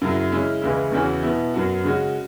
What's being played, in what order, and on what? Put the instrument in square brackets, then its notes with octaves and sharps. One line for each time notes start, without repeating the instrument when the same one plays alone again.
[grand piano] F#2 C#3 F#3 E4
C#3 G#3 C#4 E4
C#2 C#3 E3 G#3 E4
E2 C#3 E3 C#4 F#4
B2 B3 E4
F#2 F#3 B3 F#4
C#3 G#3 C#4 F#4